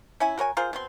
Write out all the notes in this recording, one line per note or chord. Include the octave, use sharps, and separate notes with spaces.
C#4 E4 G#5
F#4 A#4 C#5 G#5
F4 G#4 A#4 C5
B2 C4 C6